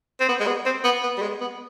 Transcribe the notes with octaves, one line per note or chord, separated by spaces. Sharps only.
C4
B3
G#3
B3
C4
B3
B3
G3
G#3
B3